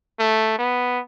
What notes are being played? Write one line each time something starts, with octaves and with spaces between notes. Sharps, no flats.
A3
B3